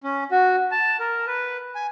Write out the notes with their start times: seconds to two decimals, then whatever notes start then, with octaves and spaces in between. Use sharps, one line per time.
0.04 C#4
0.31 F#4
0.72 A5
1.00 A#4
1.27 B4
1.75 G#5